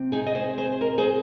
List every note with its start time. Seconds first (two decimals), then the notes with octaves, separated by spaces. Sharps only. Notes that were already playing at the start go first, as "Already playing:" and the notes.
Already playing: C3 C4
0.12 D#4 G#4
0.26 D#5
0.35 G#4 C5
0.58 G#4 C5
0.81 A#4 D#5
0.98 G#4 C5